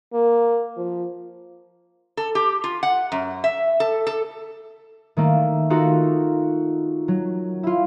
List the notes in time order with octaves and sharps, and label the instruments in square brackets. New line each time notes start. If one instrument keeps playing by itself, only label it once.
[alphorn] A#3
F3
[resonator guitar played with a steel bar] A4
G4
F4
F#5
F#2
E5
A4
A4
[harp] D#3 A3 A#3
D#4 F4 F#4 A4 A#4
F#3
E4 F4